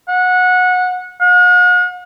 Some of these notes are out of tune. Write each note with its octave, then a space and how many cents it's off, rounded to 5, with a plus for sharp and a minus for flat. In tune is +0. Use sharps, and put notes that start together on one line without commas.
F#5 -20
F#5 -45